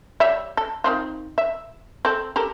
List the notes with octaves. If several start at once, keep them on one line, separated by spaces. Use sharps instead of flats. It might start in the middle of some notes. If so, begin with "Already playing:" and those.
G3 C#5 E5
A4
D#3 C4 F4
E5
C4 A4
G4 A4 A#4